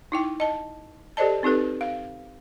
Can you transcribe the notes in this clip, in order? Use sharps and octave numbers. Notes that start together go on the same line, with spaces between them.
D#4 E4 G5
D#5 A5
G4 A4 C5 D5 D#5 A5
C4 D#4 G4 A4 B4
F5